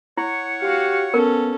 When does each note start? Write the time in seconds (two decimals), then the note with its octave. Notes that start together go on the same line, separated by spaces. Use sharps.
0.17 E4 C#5 F#5 C#6
0.62 F#4 G4 F5
1.14 B3 C#4 A4 A#4